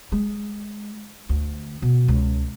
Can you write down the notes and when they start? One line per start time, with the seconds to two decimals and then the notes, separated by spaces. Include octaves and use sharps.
0.12 G#3
1.29 D2
1.82 B2
2.08 C#2